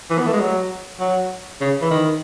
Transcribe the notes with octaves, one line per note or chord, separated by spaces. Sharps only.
E3
B3
A3
G#3
F#3
F#3
C#3
E3
D#3